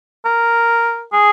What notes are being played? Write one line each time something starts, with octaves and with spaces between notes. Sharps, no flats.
A#4
G#4